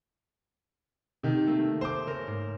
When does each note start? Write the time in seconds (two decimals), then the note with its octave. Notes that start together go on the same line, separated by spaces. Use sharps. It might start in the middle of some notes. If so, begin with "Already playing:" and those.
1.23 C3 D#3
1.47 A3 A#3
1.81 C5 D6
2.06 C#3 A#4
2.27 G#2